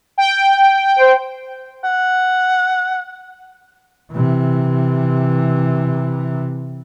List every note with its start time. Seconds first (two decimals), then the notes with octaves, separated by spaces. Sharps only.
0.18 G5
0.99 C5
1.84 F#5
4.12 C3 E3